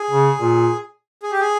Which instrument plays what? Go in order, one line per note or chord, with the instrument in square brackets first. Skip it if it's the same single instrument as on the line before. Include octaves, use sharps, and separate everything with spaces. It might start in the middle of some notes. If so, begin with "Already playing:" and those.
Already playing: [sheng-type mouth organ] G#4
[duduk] C#3
A#2
[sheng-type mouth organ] G#4
G4
G#4